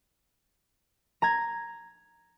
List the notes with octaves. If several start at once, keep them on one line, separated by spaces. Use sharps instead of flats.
A#5 G#6